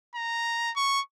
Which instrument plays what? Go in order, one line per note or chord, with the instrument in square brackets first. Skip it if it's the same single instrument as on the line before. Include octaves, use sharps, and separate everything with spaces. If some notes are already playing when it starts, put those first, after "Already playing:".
[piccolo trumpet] A#5
C#6